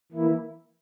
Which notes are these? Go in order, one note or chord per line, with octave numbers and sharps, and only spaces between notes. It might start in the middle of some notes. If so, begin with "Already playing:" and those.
E3 A#3 E4